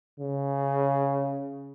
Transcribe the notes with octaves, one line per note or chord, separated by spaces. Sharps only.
C#3